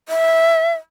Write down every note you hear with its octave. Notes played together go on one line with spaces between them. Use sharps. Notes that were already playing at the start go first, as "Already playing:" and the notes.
E5